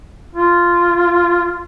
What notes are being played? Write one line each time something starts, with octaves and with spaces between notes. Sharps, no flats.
F4